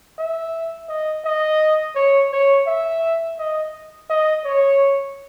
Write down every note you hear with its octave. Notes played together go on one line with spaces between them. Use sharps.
E5
D#5
D#5
C#5
C#5
E5
D#5
D#5
C#5